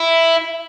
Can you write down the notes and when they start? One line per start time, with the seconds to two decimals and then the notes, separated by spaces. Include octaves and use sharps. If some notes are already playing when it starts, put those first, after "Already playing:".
Already playing: E4